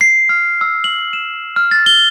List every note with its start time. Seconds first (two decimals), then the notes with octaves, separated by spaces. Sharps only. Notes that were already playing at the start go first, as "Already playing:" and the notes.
0.01 C7
0.29 F6
0.61 E6
0.84 F#7
1.13 E7
1.56 F6
1.71 A6
1.86 G7